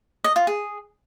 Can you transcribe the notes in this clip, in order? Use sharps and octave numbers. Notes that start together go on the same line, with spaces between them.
D#5
F4
G#4